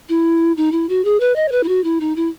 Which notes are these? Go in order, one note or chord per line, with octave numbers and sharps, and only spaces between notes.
E4
D#4
E4
F#4
G#4
B4
D#5
C#5
B4
E4
F#4
E4
D#4
E4